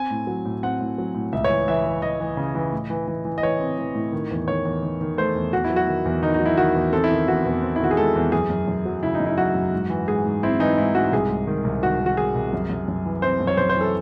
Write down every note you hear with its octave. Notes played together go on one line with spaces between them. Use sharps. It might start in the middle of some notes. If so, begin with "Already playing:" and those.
Already playing: C4 G#5
A2
F#3
A2
C4 F#5
A2
F#3
A2
C#2 E5
C#5
E3
E3 E5
E3
E3 D#5
E3
C#3
E3
A2
E3
E3
E3
D#5
E3 C#5
C4
E3
A2
D#3
E2
D#3 C#5
E2
D#3
D#3
A3 C5
E2
E2 F#4
E4
F#3
F#4
D#3
E2
D#3 D#4
D#4
F#3
E4
D#3 F#4
E2
C4 A4
E4
D#3
E2 F#4
E2
C4
E4
D#3 F#4
G#4
G#3 A4
E2
F#2 G#4
F#2
F#2
F#3
C#3 E4
D#4
F#2
E4
F#3 F#4
F#2
G#2
E3
G#2 G#4
G#2
C4 E4
E3 D#4
G#2 E4
G#2 F#4
C2 G#4
G#3
D#3
C2
D#3 F#4
D#3
F#4
D#3 G#4
C2
F#2
F#2
F#2
E3
C4 C5
F#2
C#5
F#2 C5
C5
E3 A4